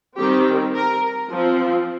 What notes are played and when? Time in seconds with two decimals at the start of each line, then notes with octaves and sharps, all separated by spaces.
0.18 D#3 G3 C4 G4
0.75 A#4
1.32 F3 C4